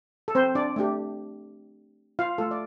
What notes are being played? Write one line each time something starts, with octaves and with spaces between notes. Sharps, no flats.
A4
C4 C5
D4 D5
A3 D4 G4
F4 F5
A3 F4 A4
D5